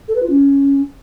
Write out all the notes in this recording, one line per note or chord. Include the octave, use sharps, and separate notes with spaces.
A4
B4
F4
C#4